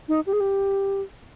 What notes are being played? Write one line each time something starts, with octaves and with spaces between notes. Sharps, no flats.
D#4
G4
G#4
G4